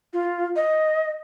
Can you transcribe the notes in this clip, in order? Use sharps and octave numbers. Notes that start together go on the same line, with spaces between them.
F4
D#5